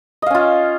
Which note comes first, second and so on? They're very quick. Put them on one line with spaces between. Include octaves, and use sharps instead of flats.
D#5 F5 C#4 F4